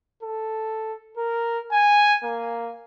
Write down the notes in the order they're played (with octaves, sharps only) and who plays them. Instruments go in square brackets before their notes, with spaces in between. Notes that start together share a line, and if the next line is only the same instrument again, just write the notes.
[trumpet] A4
A#4
G#5
A#3